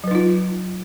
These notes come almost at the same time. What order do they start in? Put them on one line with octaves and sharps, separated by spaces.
F#3 B4 D#4 F4